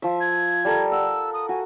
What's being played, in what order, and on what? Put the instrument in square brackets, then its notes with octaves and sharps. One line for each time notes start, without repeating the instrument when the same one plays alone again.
[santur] F3 E5
[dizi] G#6
[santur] G3 A4 A#4
[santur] F#5 [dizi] E6
[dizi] D#6
[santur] F#4 [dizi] G#5